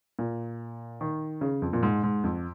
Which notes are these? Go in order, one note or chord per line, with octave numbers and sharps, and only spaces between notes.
A#2
D#3
C#3
F2
A#2
G#2
G#2
F2